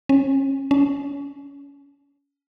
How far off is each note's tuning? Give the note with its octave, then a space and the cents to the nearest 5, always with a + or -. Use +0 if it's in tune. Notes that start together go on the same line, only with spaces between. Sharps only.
C#4 -30
C#4 +25